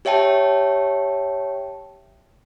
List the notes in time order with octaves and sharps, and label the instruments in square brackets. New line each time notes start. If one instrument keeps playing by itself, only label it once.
[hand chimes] G4 C#5 E5 G5 A5